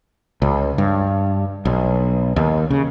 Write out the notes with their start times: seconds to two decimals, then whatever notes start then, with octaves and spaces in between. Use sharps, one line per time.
0.42 C#2
0.78 G2
1.65 B1
2.36 D#2
2.70 C#3